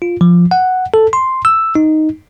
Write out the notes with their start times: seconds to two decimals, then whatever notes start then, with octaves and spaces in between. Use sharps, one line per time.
0.02 F4
0.21 F3
0.51 F#5
0.94 A4
1.13 C6
1.45 E6
1.75 D#4